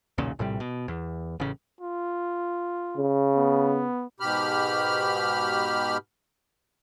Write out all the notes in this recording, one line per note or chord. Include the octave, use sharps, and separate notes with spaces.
B1 E2 A#2 C#3
A#1 A2 C3 G3
B2
E2
A1 C#3
F4
C#3
B3
G#2 B2 G4 B5 F6